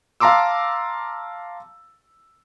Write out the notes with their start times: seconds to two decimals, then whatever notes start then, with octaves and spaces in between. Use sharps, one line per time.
0.20 F5 A5 A#5 C6 D6 E6